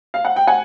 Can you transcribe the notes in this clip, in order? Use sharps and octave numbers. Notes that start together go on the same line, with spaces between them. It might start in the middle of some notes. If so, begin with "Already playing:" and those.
F5
F#5
G5
F#5 G#5